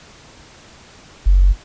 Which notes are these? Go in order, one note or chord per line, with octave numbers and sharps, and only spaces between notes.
F#1